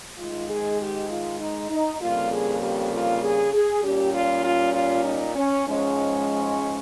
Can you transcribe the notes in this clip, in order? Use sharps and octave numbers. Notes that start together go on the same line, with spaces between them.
G#2 D#3 G#3 F4
G#4
G4
F4
D#4
D#4
F2 C#3 G3 A#3 F4
G#4
G4
F4
G#4
G#4
A#2 G3 C#4 G4
F4
F4
F4
D#4
C#4
G#2 F3 G#3 C#4